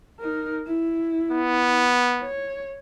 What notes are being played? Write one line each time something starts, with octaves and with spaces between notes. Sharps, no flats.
D#4 A#4
E4
B3
C#5